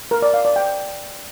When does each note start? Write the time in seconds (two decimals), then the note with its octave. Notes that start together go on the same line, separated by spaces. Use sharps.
0.11 A#4
0.22 D5
0.34 F5
0.45 D5
0.56 G5